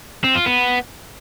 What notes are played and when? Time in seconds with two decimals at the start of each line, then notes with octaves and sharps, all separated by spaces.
0.24 C4
0.35 F4
0.46 B3